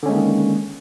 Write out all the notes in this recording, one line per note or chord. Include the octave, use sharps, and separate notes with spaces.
D3 D#3 G#3 A#3 C#4